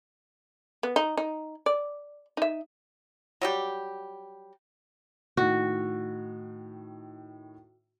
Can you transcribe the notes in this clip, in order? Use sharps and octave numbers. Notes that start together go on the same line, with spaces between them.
B3
D#4
D#4
D5
D#4 E5
F#3 G3 G4
A2 D#3 F#4